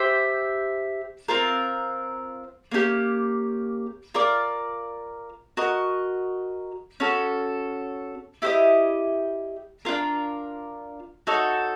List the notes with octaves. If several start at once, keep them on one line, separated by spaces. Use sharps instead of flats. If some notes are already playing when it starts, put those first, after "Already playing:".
Already playing: G4 C5 E5 G5
C4 F4 A#4
A#3 C#4 E4 G4
F4 A#4 D5
F#4 A#4 D#5
C#4 F#4 A4
E4 G4 C5 D#5
D4 F4 A#4
D#4 F#4 A4 C#5